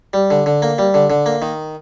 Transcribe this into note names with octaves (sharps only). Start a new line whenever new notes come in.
G3
D3
D3
A#3
G3
D3
D3
A#3
D#3